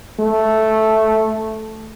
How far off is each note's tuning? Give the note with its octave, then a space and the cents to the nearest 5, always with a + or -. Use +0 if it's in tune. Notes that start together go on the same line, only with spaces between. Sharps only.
A3 -5